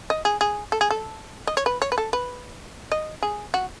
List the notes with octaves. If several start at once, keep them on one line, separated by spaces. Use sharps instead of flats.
D#5
G#4
G#4
A4
G#4
A4
D#5
C#5
B4
C#5
B4
A4
B4
D#5
G#4
F#4